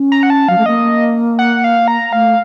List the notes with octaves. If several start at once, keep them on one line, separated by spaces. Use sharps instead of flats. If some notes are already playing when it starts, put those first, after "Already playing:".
Already playing: C#4
A#5
F#5
A5
F#3 F5
A3
A#3 D#5
F#5
F5
A#5
A3 F5